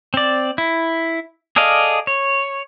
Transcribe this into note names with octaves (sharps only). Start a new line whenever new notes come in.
C4 D5
E4
G#4 A4 D5 D#5 F5
C#5